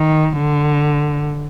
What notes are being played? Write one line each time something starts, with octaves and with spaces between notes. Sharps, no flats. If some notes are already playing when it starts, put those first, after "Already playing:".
Already playing: D#3
D3